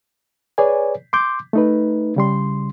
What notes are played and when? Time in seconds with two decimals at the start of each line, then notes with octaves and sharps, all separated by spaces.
0.58 G#4 B4 C#5 D5 G#5
1.13 C6 D6 G6
1.53 A3 D#4 B4
2.16 C#3 G3 C6